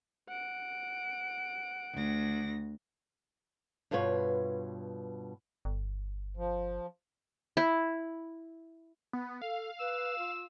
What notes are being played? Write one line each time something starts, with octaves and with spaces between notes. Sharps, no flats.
F#5 D7
D2 A#6
G2 B2 F4 B4 C#5
G1
F3
E4
B3
A4 F5
B4 E6
F4